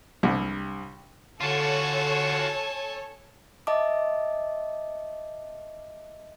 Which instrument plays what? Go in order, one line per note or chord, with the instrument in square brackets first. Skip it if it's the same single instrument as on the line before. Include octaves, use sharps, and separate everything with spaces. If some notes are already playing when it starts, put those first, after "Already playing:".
[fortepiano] C2 G2
[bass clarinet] D3 [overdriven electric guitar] F4 F#4 [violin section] A4 C#5 [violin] G#5 A5
[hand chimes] D#5 E5 A5 D6